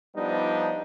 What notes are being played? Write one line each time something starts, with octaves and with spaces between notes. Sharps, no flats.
F3 G3 B3 D4 D#4